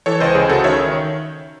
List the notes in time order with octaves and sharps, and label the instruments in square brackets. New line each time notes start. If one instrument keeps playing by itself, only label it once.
[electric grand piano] E3 A4 C#5
C#2 C5 D#5
C#2 G#4 C5
C#3 F#4 A4
D#3 C#5 E5